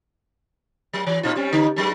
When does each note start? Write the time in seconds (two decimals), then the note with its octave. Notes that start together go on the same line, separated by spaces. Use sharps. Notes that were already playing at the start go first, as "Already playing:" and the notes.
0.93 F#3
1.06 E3
1.23 A#2 D#4 F4
1.36 G3 C4 C#4
1.52 D3 D#4
1.76 G2 F#3 G#3